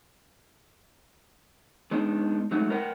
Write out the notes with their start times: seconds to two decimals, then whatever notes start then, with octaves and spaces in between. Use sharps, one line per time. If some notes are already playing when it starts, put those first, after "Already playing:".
1.91 G#3 B3 D4 D#4
2.51 F#3 G#3 A3 D#4 F#4
2.70 A#4 B4 D#5 F#5 G5